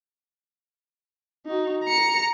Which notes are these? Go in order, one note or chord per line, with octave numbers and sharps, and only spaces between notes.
D#4 F#4
A#5 C#7